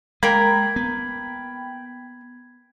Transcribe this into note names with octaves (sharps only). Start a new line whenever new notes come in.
G#3 A#3 A#4 G5 B5 G#6
B3